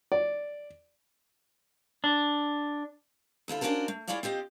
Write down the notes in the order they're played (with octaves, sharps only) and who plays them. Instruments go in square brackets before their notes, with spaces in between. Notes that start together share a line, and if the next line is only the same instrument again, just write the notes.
[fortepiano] D5
[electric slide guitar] D4
[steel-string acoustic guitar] D2 E4 F4 A4
C#4 D4 F4 F#4 A#4 C5
A3
E4 F4 G#4 C#5 D5 F5
C4 F4 G4 D#5